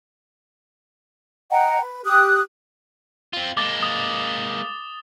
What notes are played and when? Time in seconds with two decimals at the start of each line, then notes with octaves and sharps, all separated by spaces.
1.52 D#5 F#5 G5 A#5
1.81 B4
2.04 G4 D#6 F#6
3.33 C4 F4
3.57 G#3 A#3 D6 A6 G7
3.83 D#6